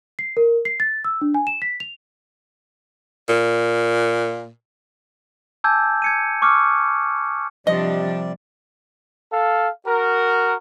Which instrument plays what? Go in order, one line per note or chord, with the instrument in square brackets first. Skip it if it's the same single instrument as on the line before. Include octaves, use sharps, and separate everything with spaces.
[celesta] C7
A#4
C7
A6
E6
D4
G#5
E7
B6
F7
[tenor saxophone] A#2
[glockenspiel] G#5 A5 D6 E6 G6 G#6
G#6 C#7 D#7
C#6 D6 E6 F6 C#7
[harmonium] C3 G3 D5 [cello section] F3 D4 [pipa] D#5
[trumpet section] A4 F5
F#4 A#4